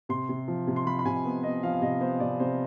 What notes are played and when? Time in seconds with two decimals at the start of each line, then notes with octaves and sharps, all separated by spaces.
0.09 C3 C6
0.29 C3
0.48 F3
0.67 C3
0.76 C6
0.86 F3 B5
0.99 B5
1.05 C3 G#5
1.25 B3
1.43 B3 D#5
1.63 F3 F5
1.73 F5
1.82 C3 D#5
2.01 B3 C5
2.20 C3 D5
2.40 C3 C5